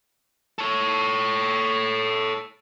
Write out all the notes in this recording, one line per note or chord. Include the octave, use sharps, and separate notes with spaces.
A4 C#5